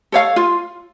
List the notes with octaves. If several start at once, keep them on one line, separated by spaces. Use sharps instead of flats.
A4 C#5 F5
F4